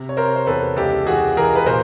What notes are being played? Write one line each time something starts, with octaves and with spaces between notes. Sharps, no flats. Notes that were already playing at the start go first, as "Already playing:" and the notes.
Already playing: C3
C#5
C3 A#4 C5
C5
E2 A4 B4
C#2 G4 A4
E3 F#4 G#4
E3 G#4 A#4
B4
A#2 A#4 C5